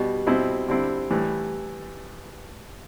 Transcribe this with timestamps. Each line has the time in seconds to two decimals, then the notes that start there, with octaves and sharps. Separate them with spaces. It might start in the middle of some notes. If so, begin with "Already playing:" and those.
Already playing: B2 G3 B3
0.27 B2 G3 C4 E4
0.68 D3 G3 C4 E4
1.11 A2 E3 G3